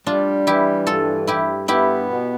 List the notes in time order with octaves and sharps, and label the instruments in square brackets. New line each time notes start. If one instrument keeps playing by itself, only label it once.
[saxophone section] G3 [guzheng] D4 F4
[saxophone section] E3 [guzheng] E4 G4
[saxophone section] G2 [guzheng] F4 A4
[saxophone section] G2 [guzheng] E4 G4
[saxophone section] B3 [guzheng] E4 G4
[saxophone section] B2